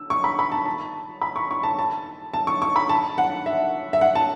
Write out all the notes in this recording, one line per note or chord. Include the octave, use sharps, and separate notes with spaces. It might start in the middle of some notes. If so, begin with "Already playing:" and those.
Already playing: E6
C#6
B5
B5
A5
A5
B5
C#6
C#6
A5
A5
A5
C#6
C#6
B5
A5
F#5
E5
E5
F#5
A5